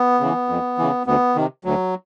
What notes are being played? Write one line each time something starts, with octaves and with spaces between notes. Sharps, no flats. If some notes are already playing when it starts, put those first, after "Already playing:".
Already playing: B3
C#3 E3
F2
C#3 E3
D2 B3
C3 D#3
D2 F#3